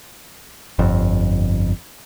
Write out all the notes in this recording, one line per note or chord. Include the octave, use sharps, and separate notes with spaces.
G1 F2